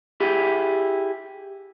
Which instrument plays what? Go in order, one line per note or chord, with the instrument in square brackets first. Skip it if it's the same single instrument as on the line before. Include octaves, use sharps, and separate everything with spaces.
[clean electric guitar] E4 G4 G#4